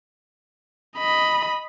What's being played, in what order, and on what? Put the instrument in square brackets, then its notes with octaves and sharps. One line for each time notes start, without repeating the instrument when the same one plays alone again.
[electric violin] D#5 B5